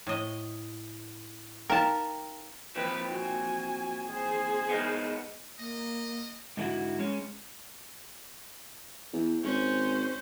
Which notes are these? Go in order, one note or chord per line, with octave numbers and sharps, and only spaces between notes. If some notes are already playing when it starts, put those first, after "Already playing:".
A2 D#5
D#4 A#4 F5 G5 A5
F2 A#2 C4 B4
F#4 G#5
G#4 C5
D#3 G#3 B3
A#3 D#5
G#2 D3 F#3 A3 E4 F#4
G#3 C#4
E2
G#1 C#4 C5